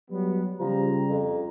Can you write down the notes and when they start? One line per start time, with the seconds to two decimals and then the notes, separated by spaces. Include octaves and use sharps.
0.11 F#3 G3 B3
0.60 C#3 F3 G3 A#5
1.09 F2